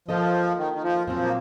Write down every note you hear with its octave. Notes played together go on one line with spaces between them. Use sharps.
F3 A#3 F4 A4 D#5
D#3
D#3
F3
A#2 F3 F#3 C4
A#3